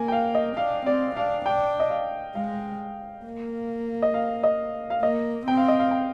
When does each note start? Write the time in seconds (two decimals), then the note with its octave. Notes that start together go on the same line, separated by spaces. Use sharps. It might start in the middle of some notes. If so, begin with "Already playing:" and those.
Already playing: A#3 G#5
0.08 G5
0.12 F5
0.35 D#5
0.57 D4 F5
0.86 C4 D5
1.16 D4 F5
1.46 D4 G5
1.80 D#5
1.90 F5
2.35 G#3 F5
3.25 A#3
4.02 D#5
4.14 F5
4.43 D#5
4.90 F5
5.02 A#3 D#5
5.47 C4 G5
5.57 F5
5.68 D#5
5.79 F5
5.91 G5